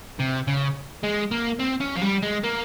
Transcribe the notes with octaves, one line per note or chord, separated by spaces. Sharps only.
C3
C#3
G#3
A#3
C4
C#4
F3
G3
G#3
A#3